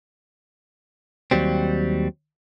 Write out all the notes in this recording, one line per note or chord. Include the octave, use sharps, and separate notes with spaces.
D#2 F#3 G3 C4